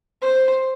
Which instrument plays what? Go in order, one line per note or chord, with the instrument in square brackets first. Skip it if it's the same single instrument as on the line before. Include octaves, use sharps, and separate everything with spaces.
[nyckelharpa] C5